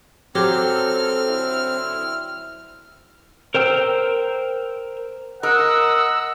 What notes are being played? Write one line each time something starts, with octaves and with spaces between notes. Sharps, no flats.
F#3 C4 G4 A4 F6
D3 E4
A#4 C5 G5 E6
A#4 D#5 F#5 E6